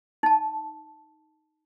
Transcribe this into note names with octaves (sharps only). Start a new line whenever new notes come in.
D#4 A5